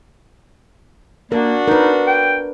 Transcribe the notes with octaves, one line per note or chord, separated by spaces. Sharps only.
A#3 D4 F#4 A#4
D#4 A#4 B4
G5